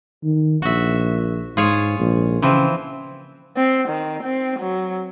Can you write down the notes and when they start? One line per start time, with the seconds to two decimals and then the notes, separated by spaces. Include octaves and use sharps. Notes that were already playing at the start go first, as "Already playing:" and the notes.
0.24 D#3
0.62 A#1 F#4 E5
1.57 G#2 F4 G#4 C#5
1.99 A#1
2.42 C#3 E3 F3 C4
3.56 C4
3.88 D#3
4.23 C4
4.59 F#3